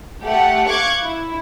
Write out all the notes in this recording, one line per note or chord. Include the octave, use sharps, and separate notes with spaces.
A3 G4 F#5
F5 C#6 D6 F#6 G#6
E4